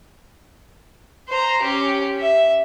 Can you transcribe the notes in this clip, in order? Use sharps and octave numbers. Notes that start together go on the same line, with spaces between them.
C5 A#5
C#4 G4
E5